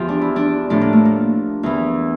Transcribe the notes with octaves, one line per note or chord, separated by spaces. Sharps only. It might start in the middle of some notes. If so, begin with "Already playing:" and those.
Already playing: E2 F3 F4 G4
D4
E4
D4
A2 F3 D4
A#3
A3
A#3
E2 E3